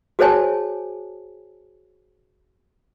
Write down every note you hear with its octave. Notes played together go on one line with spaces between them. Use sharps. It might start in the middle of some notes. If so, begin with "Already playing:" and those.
F#4 G#4 C5 C#5 G#5 A5